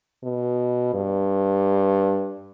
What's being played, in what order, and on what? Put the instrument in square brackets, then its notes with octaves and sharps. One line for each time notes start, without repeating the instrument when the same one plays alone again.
[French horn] B2
G2